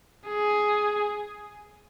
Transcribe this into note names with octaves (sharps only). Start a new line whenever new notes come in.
G#4